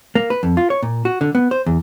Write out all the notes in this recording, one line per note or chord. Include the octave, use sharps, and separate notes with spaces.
A#3
B4
F2
F4
C#5
A#2
F#4
D3
B3
C5
E2